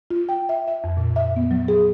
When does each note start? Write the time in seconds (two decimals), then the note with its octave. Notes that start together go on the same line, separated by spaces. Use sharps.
0.11 F4
0.29 G5
0.49 E5
0.68 E5
0.84 F2
0.97 A#2
1.16 E5
1.36 B3
1.51 F#3
1.68 G#4